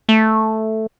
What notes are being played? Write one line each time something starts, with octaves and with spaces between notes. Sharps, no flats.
A3